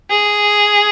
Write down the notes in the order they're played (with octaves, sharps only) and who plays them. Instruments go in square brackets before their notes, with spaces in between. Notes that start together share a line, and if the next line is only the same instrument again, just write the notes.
[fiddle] G#4